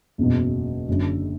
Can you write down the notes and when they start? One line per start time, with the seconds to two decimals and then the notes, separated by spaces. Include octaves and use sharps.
0.18 F#1 E2 B2
0.88 F#1 F#2 D3